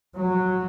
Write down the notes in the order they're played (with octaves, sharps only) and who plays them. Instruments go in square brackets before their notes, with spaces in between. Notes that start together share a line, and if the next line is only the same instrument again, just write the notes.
[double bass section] F#3